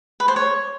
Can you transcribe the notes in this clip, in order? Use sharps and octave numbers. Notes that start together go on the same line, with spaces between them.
B4
C5
C#5